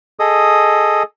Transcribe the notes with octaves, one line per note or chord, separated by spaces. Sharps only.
G#4 A4 D#5 D#6